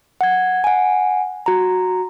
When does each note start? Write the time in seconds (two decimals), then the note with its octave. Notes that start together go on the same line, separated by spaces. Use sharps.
0.21 F#5 G#6
0.64 F#5 G#5
1.46 F#4 A#5